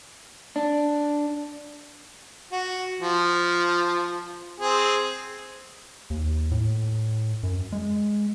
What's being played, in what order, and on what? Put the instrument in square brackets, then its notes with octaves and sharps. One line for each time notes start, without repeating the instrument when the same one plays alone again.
[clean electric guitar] D4
[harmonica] F#4
F3
C4 G#4
[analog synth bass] D#2
A2
F#2
G#3